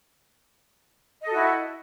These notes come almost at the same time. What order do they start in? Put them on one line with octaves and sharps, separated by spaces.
D#5 A4 F#4 E4